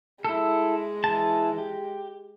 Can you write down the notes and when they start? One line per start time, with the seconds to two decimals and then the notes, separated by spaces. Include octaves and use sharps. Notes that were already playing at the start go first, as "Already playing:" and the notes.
0.25 G#3 E4 A4
1.04 E3 A5
1.58 G4